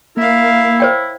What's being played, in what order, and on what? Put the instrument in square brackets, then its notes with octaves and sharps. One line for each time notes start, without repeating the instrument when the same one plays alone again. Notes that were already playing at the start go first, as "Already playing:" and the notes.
[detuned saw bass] A#3 [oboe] E4 [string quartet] A#4 E5 F5
[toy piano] C5 C#5 G5